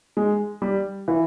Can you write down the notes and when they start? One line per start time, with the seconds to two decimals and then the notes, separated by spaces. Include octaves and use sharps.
0.17 G#3
0.62 G3
1.08 E3